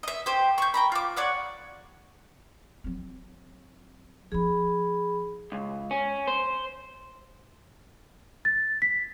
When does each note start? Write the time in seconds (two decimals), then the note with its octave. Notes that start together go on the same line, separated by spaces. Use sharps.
0.03 D#5 E5
0.26 G4 C5
0.58 C#6 G6
0.74 G5 A#5 B5
0.92 F4 D6
1.16 C#5 D5 F#5
2.84 F#3 C4
4.32 F3 D#4 G#4 B5
5.52 C#2
5.91 C#4
6.28 C5
8.45 A6
8.82 B6